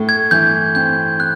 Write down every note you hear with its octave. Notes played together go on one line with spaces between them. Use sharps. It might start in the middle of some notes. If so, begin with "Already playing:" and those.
Already playing: A2 A3
G#6
E3 G6
C4 G6
F#6